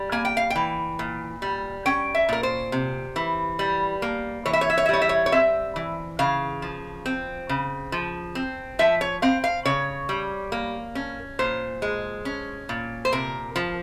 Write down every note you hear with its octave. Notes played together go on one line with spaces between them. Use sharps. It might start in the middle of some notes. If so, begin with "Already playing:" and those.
Already playing: G3
A#3 G#5
G5
F5
G5
E3
A#2
G3
C#4 G5
E5
A#2 A#4
C5
C3
E3
G3
A#3
E3 C#5
E5
C#5
E5
C#5
E5
G3 C#5
E5
C#5
C#5
C4 E5
E3
C#3 F5
F3
C4
C#3
F3
C4
F3 E5
C#5
C4 F5
F5
C#3 C#5
G3
A#3
C#4
A#2 C5
G#3
C#4
A#2
C5
C3 A#4
F3